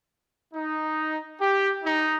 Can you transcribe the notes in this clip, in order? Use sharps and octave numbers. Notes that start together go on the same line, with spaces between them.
D#4
G4
D#4